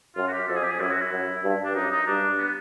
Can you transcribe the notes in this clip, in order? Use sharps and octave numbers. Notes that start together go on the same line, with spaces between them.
F#2 F4
F#4
G4
F2 A4
G#4
G4
G#4
F#2 E4
F#4
E4
F#2
G2
D4
F#2 D#4
D#4
G2 D4
B3